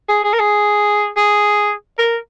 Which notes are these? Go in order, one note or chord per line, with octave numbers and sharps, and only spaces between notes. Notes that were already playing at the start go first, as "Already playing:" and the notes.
G#4
G#4
A#4
G#4
G#4
A#4